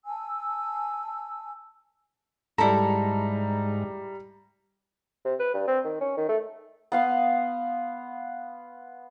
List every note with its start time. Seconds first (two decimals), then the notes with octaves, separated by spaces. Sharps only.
0.06 G#5 A5 E6
2.58 G#2 G3 E4 A4 A#5
5.25 C3
5.40 B4
5.54 G2
5.67 C4
5.85 D#3
6.01 C#4
6.17 D#3
6.29 A3
6.92 B3 F5 C6